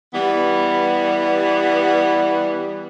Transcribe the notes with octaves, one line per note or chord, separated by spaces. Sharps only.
E3 G3 B3